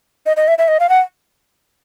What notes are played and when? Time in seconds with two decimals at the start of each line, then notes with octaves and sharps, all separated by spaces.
0.26 D#5
0.37 D#5
0.48 E5
0.58 E5
0.68 D#5
0.80 F5
0.89 F#5